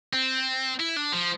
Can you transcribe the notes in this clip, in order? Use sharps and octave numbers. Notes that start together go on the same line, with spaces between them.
C4
E4
D4
F3